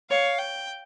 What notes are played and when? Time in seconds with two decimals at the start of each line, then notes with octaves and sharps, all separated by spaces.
0.10 C#5 F5
0.39 G5